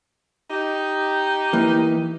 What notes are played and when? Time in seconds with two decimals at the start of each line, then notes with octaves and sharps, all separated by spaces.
0.51 D#4 G4
1.53 E3 A#3